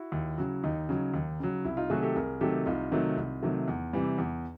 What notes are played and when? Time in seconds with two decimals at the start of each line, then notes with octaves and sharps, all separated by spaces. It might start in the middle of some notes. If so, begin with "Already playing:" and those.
Already playing: E4 F#4
0.12 D#2
0.38 C#3 F#3
0.63 D#2 D#4
0.89 C#3 F#3
1.14 D#2
1.40 C#3 F#3
1.65 C2 E4
1.77 D#4 F4
1.90 C3 D#3 F#3 A3 F#4 G#4
2.03 G4 A4
2.16 C2 G#4 A#4
2.41 C3 D#3 F#3 A3 G4 A4
2.66 C2 D#4 F4
2.92 C3 D#3 F#3 A3
3.17 C2
3.42 C3 D#3 F#3 A3
3.68 E2
3.93 C3 E3 G3
4.18 E2